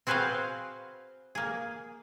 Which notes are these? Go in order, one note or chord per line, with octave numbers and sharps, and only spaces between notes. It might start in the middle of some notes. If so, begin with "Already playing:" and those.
C4 F#4 G#4 B4 C5 F5
A#3 G#4